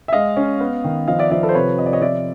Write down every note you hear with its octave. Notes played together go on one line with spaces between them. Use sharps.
E5
G#3 D#5 F5
C#4
B3
D#3
F3 D#5 F5
D5 E5
F3 D5 E5
A4 B4
C5
C3 B4 C#5
C3 D#5
D5
C#5 D#5
F3 D5 E5